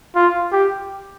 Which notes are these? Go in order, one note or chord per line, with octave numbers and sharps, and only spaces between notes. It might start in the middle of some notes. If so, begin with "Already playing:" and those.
F4
G4